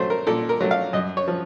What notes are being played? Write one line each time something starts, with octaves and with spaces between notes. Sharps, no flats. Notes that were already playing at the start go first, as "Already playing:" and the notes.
Already playing: F#3 A3 C5
A#4
A#2 A4
A#4
F#3 A3
F5
F#2 D#5
C#5
F3